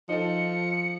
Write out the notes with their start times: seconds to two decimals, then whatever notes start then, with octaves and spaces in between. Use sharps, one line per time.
0.09 F3 D#4 A4 C#7